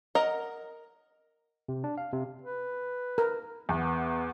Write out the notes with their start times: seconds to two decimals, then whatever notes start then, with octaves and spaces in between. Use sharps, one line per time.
0.15 A#4 D#5 F#5 A#5
1.68 C3
1.84 D4
1.98 F5
2.13 C3
2.42 B4
3.18 A#4
3.69 E2 B3